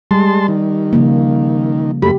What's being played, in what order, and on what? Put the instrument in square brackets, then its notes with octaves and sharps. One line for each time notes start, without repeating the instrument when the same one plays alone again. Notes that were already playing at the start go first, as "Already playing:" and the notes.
[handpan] G3 [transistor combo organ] G#3 A5 C6
[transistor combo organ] D#3
[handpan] C#3 F3 A#3
[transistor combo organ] F#2 A3 B5 [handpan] G4